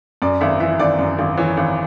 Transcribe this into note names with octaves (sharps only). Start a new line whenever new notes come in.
F#2 D5
G#1 E5
E3 E5
G#1 D5
F#2
G#1
E3 C#5
G#1